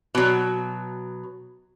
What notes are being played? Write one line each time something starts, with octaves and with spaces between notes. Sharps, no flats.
B2 F#3